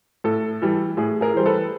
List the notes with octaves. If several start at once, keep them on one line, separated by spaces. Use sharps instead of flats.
A2 A4
E3 G3
A2 G#4
G#4 A#4
E3 G3 C5
A4 B4